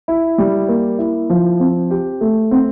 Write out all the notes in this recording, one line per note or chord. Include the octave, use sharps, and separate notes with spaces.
E4
G3
A#3
E4
F3
C4
G4
A3
C4